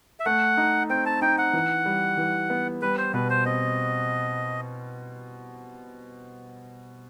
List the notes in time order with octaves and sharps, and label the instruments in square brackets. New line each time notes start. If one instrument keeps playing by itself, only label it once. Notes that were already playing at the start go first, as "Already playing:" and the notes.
[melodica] E5
[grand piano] A3 [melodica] F#5
[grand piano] D#4
[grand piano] C4 [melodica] G5
[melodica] A5
[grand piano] D#4 [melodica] G5
[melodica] F#5
[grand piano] E3
G3
E3
B3
[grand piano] G3 [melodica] B4
[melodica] C5
[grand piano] B2 [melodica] B4
[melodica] C5
[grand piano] C4 [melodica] D#5